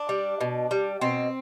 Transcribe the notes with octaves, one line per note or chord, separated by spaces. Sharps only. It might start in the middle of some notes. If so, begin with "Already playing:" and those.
Already playing: D4
G3
B2
G3
B2 C4